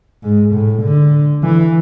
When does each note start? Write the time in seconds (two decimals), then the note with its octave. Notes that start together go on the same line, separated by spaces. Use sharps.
0.24 G#2
0.54 A2
0.83 D3
1.43 E3